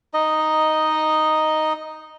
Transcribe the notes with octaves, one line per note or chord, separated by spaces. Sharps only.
D#4 D#5